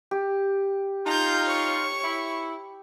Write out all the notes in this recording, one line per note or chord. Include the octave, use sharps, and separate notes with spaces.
G4
D#4 F4 A#5 G6
C#5 C#6
E4